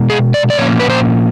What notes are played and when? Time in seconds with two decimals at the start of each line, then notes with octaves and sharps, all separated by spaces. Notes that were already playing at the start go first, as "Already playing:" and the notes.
Already playing: B2 G#3 B3
0.10 G#4
0.34 D5
0.50 D5
0.58 A#2 F3 A#3 C#4 C#5
0.80 B4
0.90 C5